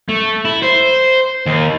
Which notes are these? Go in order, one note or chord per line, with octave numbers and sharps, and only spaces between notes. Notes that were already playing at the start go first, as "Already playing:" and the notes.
A3
E4
C5
D#2